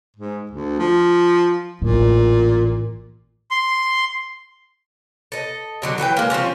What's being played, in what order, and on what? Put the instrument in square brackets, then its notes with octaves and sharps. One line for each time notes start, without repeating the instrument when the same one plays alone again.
[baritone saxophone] G#2
D2
F3
[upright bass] A1 [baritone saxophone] A#2
[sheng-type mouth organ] C6
[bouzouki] A4 D#5
B2 D3 F#3
E3 F#3 B4 G5
G#3 A#3
F3 G3 C4 C#4